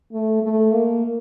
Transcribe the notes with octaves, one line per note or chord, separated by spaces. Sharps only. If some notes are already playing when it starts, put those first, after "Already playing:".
A3
A3
A#3